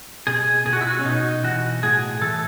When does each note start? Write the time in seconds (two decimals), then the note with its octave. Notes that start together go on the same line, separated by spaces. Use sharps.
0.27 B2 G#4
0.66 B2 G#4
0.73 F#4
0.81 E4
0.87 F#4
0.99 C#4
1.05 B2 D#4
1.43 E3 F#4
1.83 A2 G#4
2.22 E3 A4